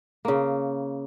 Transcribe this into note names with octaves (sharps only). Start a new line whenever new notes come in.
C#3 A#3